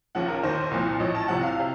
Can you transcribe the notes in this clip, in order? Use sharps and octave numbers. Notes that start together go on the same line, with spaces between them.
D#2 C#3 F3 F#5
A#4
D#2 D#3 C5
C2 A#2 F3
A1 A2 F3 D#5
A5
C2 C3 F3 F#5
F5
C3